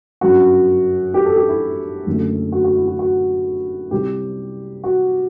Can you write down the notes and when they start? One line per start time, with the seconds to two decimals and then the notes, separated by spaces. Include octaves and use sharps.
0.21 G1 F#2 F#3 F#4
1.14 G4
1.26 A4
1.37 G4
1.49 E4
2.06 F#1 F#2 D3 F#3 A3
2.52 F#4
2.64 F#4
2.76 E4
2.88 F#4
2.99 F#4
3.91 C2 C3 G3 G4
4.84 F#4